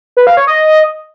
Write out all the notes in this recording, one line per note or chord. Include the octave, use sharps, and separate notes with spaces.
B4
F5
C#5
D#5